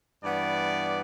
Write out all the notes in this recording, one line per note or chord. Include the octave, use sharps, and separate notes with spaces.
G2 E3 B3 D5